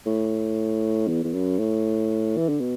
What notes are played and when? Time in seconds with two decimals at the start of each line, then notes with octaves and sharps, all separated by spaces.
0.06 A2
1.07 E2
1.24 E2
1.33 F#2
1.59 A2
2.37 E3
2.49 D3
2.60 B2